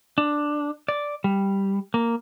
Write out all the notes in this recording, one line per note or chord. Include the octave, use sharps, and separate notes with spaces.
D4
D5
G3
A#3